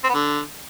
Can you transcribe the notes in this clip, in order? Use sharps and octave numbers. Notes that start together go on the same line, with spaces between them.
C4
B3
D3